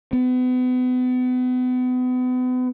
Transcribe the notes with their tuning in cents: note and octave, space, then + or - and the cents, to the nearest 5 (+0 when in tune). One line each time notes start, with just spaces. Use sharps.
B3 +35